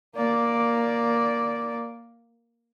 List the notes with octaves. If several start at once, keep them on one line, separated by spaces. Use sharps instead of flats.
A#3 D5